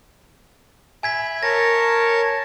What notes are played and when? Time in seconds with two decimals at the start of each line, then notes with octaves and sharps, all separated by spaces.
1.03 E5 G#5 B5 G#6 B6
1.43 A#4 C#5 A5 A#6